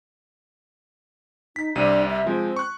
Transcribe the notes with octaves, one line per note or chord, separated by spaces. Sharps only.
D#4 B6
C2 C3 D4 D#7
E5
F3 G#3 C4
C#6 F#6